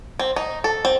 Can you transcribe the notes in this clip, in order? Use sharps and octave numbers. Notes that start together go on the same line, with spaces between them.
C4
D#4
A4
C4